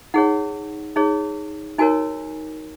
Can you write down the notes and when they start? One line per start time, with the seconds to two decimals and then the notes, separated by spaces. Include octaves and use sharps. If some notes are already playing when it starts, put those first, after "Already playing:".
0.14 D#4 G#4 C#5 F#5
0.96 D#4 G#4 C#5
1.79 D#4 F#4 A#4 C#5 G#5